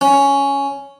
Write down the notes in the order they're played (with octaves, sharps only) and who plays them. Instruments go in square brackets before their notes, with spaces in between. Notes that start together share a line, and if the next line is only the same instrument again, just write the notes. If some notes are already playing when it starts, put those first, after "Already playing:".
[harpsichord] C#4